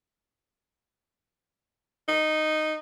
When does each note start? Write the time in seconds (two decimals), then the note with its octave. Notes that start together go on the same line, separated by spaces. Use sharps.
2.09 D#4